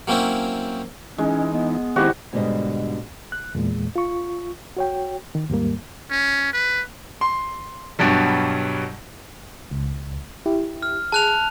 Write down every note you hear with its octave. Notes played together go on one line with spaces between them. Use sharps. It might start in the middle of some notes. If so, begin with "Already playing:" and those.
F#3 A#3 C4 C#4 E4
E3 G#3 C#4 D#4
B3
D#3 G#3 C4 E4 F#4 G4 C5
G#2 B2 D3 G3 D#5
F#6
E2 A#2 G#3
F4 C#6
F#4 C#5 G5
D#3
D#2 G#2 G3 A#3
C#4
B4
C6
G2 B2 F#3 G3
C#2
E4 G4
F6
G#4 A5 F#6 F7